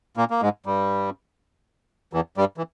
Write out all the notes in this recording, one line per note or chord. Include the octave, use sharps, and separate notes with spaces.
A#2 A#3
A#3
G#2 G#3
G2 G3
E2 E3
G2 G3
E3